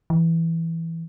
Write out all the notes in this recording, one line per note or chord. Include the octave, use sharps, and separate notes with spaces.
E3